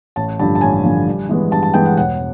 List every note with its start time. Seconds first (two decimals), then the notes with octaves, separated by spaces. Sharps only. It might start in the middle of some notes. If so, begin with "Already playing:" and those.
0.16 A1 A5
0.39 G2 D3 F3 A5
0.55 A5
0.61 A1 G#5
0.84 G2 D3 F3
1.07 G2
1.29 E3 G#3 B3
1.51 G2 A5
1.63 A5
1.74 E3 G#3 B3 G5
1.86 F#5
1.97 E1 F#5